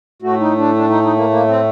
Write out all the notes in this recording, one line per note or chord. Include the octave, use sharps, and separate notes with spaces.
A2 A3 F#4
D#4
D4
D4
D#4
D#4
A#3
A#3
C4